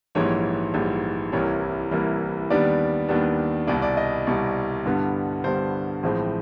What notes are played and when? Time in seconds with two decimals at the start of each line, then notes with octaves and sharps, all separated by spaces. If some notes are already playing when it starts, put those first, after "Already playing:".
0.15 A#1 G#2 E3 G3 C#5
0.74 A#1 G#2 E3 G3
1.32 C2 C3 E3 G3 A#3 C#5
1.91 C2 C3 E3 G3 A#3
2.50 D#2 D#3 G3 B3 D4 D5
3.09 D#2 D#3 G3 B3 D4
3.67 C2 B2 G3 D5
3.82 D5
3.97 D#5
4.27 C2 B2 G3
4.85 G2 D3 G3 B3
5.44 G2 D3 G3 B3 C5
6.03 A1 A2 F3 G#3 C4